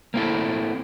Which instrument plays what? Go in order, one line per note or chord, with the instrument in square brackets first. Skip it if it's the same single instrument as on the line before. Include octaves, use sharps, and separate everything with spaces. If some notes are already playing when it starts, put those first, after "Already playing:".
[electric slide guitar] A#3 C4 E4 A4